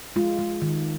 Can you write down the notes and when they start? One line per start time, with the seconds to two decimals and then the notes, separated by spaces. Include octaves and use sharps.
0.16 G#3 F4
0.39 G#3
0.62 D#3